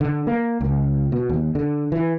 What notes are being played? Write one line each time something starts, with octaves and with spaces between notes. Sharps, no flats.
D3
A#3
C#2
B2
D#2
D3
E3